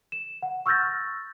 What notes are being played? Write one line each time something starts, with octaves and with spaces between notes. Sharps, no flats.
E7
F#5
C#6 E6 F6 G6 A6 A#6